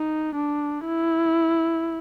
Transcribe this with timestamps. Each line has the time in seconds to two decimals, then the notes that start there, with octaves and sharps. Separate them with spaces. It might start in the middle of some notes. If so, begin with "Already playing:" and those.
Already playing: D#4
0.36 D4
0.86 E4